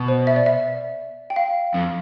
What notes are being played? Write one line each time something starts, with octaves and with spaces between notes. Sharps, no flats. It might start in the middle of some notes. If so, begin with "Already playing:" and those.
Already playing: B2
C5
E5
D5
E5
G5
F5
F2